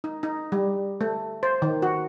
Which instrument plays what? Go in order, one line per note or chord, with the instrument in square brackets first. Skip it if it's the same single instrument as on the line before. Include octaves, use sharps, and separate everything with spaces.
[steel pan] D#4
D#4
G3
A3
C5
D#3
F#4